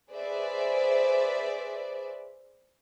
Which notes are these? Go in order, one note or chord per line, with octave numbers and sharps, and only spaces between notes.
G#4 B4 C5 D5 E5